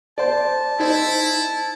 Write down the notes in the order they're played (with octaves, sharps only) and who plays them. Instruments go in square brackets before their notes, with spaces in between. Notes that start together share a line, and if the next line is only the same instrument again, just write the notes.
[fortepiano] C5 D5 [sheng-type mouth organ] A5
[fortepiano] D#4 C5 [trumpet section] E4